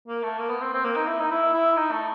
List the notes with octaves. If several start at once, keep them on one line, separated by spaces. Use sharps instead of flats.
A#3
A3
A#3
B3
C4
C4
A#3
D#4
E4
D#4
E4
E4
D#4
A3